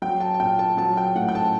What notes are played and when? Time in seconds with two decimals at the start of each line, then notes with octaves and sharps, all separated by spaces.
0.02 F#3 G5
0.20 A5
0.34 A5
0.40 A#2 G5
0.59 A5
0.77 F#3 A5
0.97 G5
1.15 A2 F#5
1.29 G5
1.35 A5